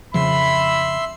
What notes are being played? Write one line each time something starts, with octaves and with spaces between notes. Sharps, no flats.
F2 C#3 F3 E5 B5 C6 E6